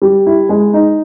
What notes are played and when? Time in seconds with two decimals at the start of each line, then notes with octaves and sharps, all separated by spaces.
0.02 G3
0.26 E4
0.49 G#3
0.74 D#4